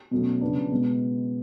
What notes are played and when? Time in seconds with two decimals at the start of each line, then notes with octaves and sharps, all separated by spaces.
0.11 B2 F#3 A3 C#4
0.41 C#3 F#3 B3 D4
0.72 B2 G#3 B3